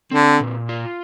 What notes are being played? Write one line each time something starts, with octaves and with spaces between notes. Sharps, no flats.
D3 C4
A#2
F4